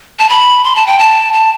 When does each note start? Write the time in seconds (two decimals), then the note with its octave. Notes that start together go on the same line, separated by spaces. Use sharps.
0.19 A5
0.29 B5
0.64 C6
0.76 A5
0.87 G5
0.99 A5
1.33 A5